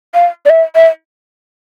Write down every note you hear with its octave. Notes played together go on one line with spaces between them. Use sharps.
F5
D5
E5
E5